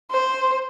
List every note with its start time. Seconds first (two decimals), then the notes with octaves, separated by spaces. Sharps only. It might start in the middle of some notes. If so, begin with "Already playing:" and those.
0.11 C5